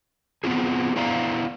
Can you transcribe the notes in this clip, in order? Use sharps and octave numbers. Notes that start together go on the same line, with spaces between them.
B3 C4 F4 G#4
B3 E4 C5 D5 F5 A#5